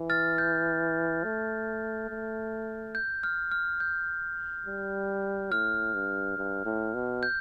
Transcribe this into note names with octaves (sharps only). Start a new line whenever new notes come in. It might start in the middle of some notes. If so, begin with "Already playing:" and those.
Already playing: E3
F6 A6
G6
A3
A3
G6
F6
F6
G6
G3
A2 F6
G2
G2
A2
B2
G6